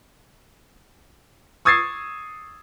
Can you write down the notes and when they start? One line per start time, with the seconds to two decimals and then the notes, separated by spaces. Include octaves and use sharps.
1.65 C#6 D#6 E6 G#6 A6 C7